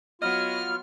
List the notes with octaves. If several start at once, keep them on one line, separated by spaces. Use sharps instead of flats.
F#3 B3 F4 D#5 F6